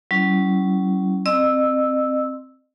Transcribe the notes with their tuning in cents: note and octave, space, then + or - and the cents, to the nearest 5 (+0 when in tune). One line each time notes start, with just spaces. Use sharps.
F#3 +40 C#4 +0 E4 +0
C4 +0 D#5 -40 E6 -5